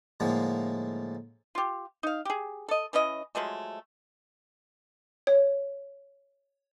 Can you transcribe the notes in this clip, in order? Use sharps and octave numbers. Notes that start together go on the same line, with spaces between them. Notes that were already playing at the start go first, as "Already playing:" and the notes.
A2 D3 F3 G#3 A#3
F4 G4
D#4 F5
G4 G#4
A4 D#5
E3 C#4 E4 D#5
F3 F#3 G#3 A3
C#5